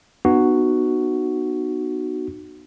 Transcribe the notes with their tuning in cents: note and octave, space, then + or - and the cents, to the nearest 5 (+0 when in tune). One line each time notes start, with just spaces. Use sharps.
B3 +0 D#4 -40 F#4 +0